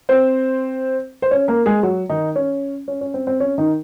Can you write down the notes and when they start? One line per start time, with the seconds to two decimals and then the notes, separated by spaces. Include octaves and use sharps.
0.09 C4 C5
1.22 C5
1.31 C#4 C#5
1.48 A#3 A#4
1.66 G#3 G#4
1.83 F#3 F#4
2.10 D#3 D#4
2.36 C#4
2.88 C#4
3.01 C#4
3.14 C4
3.27 C4
3.40 C#4
3.58 D#3 D#4